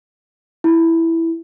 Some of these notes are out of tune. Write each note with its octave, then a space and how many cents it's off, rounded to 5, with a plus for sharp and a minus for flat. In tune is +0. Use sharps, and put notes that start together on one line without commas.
E4 +0